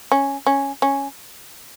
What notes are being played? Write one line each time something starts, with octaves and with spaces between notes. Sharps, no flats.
C#4
C#4
C#4